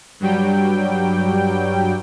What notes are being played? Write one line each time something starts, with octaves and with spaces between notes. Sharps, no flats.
G2 F#3 G3 G5